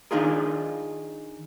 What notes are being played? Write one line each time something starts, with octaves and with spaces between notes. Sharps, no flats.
D#3 D4 D#4 F4 G#4 A#4